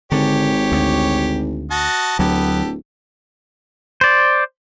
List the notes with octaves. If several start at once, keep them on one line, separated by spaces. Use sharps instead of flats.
G#1 D3 G4 C#5
D2
F#4 D#5 A5
D1 D2 F#3 B3 G4 A4
C5 D5